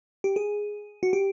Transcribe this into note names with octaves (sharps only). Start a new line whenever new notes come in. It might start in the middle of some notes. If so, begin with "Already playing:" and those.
G4
G#4
F#4
G4